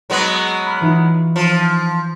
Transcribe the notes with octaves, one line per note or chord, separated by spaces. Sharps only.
F#3 G#3 B3
B5 F6
E3 D#4 F4
F3